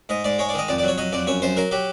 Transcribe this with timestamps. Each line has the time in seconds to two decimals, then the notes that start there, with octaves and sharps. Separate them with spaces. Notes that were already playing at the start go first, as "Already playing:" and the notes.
0.09 G#2 D#5
0.24 G#2 D5
0.39 G#3 C#5
0.49 D5
0.54 D#3 D#5
0.68 F2 D5
0.78 F#3 D5
0.88 C#5
0.98 F#3 D#5
1.13 F2 D5
1.27 F#2 C#5
1.42 F#2 C5
1.57 F#3 A#4
1.71 F#3 G4